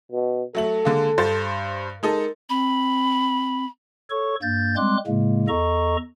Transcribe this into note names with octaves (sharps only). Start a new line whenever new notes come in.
B2
F#3 A3 A4 F#7
D3 G#3 A#3
G2 C5 A6
G#3 D#4 A4 A#4
C4 B5
A4 C#5 C#6
G2 A#3 G6 A6
G3 G#3 C4 C6 D6 F#6
A2 C#3 G#3 A#3
E2 A4 D#5 A#5 C#6